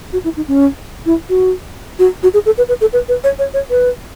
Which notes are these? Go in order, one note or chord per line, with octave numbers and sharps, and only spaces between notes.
F#4
E4
D#4
C#4
E4
F#4
F#4
F#4
G#4
A4
B4
B4
A4
B4
B4
C#5
C#5
C#5
B4